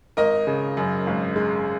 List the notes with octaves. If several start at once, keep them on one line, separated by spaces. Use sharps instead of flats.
G#1 A#4 D#5
C#3
F#2
G#1
G#3